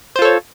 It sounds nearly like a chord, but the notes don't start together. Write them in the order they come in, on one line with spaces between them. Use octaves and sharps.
C5 F4 A4 C#5